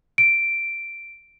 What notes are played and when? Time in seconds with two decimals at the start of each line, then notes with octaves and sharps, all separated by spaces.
0.18 D7